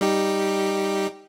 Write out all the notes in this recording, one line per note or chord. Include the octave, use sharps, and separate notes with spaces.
G3 D#4 G4